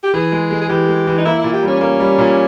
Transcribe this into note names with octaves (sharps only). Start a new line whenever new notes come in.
G4
E3 G#4
G#3
G#3
G#4
E3 G4
G#3
E3
D#4
A#3 E4
E4
A#2
G4
G3 C#4
A#3
G3
A#2